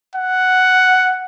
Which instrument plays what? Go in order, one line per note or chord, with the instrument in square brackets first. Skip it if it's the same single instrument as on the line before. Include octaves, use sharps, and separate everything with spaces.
[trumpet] F#5